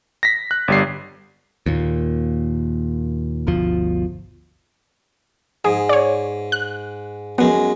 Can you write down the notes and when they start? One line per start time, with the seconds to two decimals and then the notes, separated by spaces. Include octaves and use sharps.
0.23 A#6 B6
0.51 F#6
0.68 G1 G3 C7
1.66 D#2 A#2
3.47 G1 D2 B2 F3
5.65 G#2 G#4
5.89 C#5 D5
6.52 F#6
7.38 F#2 G#3 B3